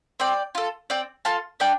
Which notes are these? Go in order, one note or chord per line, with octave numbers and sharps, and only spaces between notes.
C4 D5 G5
F4 A4
C4 D5 G5
F4 A4 F5 A5
D4 D5 G5